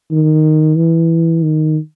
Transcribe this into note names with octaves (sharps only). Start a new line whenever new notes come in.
D#3
E3
D#3